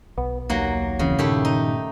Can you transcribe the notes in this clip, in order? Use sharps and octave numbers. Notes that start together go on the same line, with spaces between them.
B1 B3
D#2 F#3 A#3
D#1 C#3 E3 C4
G2 A#2 D#3 A3 E4 G4
D#4